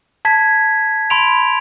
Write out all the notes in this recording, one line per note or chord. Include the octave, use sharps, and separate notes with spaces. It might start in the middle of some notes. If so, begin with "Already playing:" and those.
A5 G#6 B6
B5 C6 D7 F7